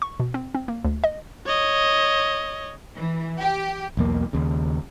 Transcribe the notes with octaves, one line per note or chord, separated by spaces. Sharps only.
C#6
B2
C4
C4
A#3
D2
D#5
C#5 D#5
E3
G4
B1 E2 A#3
D#2 C#3